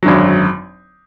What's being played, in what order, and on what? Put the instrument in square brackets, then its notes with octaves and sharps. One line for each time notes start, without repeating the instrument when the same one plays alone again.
[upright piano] G#1 F#2 D3 F#3